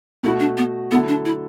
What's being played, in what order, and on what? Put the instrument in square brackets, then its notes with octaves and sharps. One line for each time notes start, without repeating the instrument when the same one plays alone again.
[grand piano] B2 A3 F#4 [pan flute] E4
[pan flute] D4
B3
[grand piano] D3 F#3 A3 E4 A4 [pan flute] B3
[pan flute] D4
E4